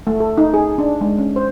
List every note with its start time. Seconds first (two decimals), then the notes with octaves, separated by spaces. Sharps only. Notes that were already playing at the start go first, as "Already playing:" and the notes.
0.07 A3
0.20 A4
0.38 D#4
0.54 G#4
0.78 D4
1.01 G#3
1.18 C#4
1.36 C5